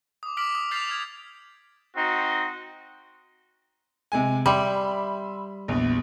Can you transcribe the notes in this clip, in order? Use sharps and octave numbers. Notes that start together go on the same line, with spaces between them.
D6 D#6
D6 F6 B6 D7 F#7
D#6
F6 G6 A6 B6 C7 F7
F6 G#6
C4 D#4 F#4
C3 G#3 G#5
G3 E5 B5 C6
A#1 E2